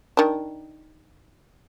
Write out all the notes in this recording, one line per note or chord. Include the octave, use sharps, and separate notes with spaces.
D#3 D4